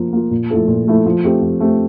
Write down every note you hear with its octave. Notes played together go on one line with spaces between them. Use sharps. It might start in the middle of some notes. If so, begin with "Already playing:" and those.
Already playing: F3 A#3 F4
A#3 F4
A#2
F3 A3 E4 A4
A#2
F3 A3 E4 A4
F3
A3 C4 G4
F3
A3 C4 G4